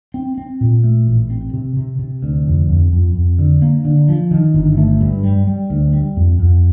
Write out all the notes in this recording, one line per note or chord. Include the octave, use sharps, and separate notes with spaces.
C4
C4
A#2
A3
A1
C4
C3
C3
C3
D2
F2
F2
F2
F2
D3
A#3
D3
F3
D#3
G1
A3
G2
G3
G3
D2
G3
F2
F2